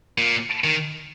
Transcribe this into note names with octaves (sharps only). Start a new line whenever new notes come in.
A#2
D#3